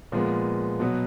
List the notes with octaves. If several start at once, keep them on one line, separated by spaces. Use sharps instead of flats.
A#2 F3 G#3 B3
B2 F#3 B3